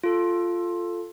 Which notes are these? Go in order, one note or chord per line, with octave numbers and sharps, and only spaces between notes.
F4 A4